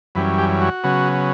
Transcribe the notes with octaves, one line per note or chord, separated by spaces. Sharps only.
F#2 E3 G3 C#4 B4
G4
F#4
C#3 F#3 B3